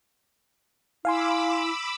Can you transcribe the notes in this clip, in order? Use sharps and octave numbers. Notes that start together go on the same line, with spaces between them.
E4 F5 G#5 B5 C6 D6 E6